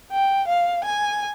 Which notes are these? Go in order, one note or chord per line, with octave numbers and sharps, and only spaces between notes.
G5
F5
G#5